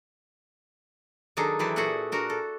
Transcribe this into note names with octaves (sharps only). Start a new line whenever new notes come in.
D#3 F#3 D4 D#4 G#4 A4
E3 F#3 E4 B4 C5 D5
A#2 F#4 G#4 A4 B4 F#5
D4 F#4 A#4
A4